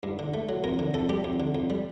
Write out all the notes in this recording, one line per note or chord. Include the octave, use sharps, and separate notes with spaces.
G2
D3
A3
F#3
F2 A#4
D3
F2 A4
G3 G4
F2
D3
F2
G3